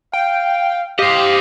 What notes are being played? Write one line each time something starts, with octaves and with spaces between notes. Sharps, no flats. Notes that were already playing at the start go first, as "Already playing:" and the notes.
F5 G5
G4 C5 D#5 F5